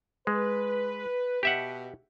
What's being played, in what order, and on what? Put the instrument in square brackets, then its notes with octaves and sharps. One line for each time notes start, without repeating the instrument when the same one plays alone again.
[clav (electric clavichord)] G#3 [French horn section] B4
[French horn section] B2 [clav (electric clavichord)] G4 E5 F#5